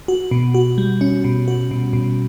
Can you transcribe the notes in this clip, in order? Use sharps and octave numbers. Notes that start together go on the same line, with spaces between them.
F#4
B2
F#4
G3
C#4
B2
F#4
B2
B2